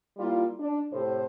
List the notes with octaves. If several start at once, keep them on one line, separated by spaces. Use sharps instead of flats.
G3 A#3 E4 F4
D4
A2 C3 C5